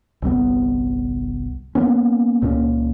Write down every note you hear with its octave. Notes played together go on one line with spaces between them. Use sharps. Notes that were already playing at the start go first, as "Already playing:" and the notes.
G1 C2 G3 B3
A#3 B3 C#4
C#2 A#2 A#3 C#4